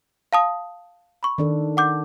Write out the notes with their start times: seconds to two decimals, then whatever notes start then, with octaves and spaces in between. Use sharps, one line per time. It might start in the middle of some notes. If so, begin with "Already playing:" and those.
0.33 F5 A5 D#6
1.23 B5 C#6
1.38 D#3 D4 A4
1.77 F#5 D6 G6